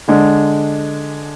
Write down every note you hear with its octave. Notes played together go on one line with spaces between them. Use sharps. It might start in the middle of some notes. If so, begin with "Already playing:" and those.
D3 G#3 D4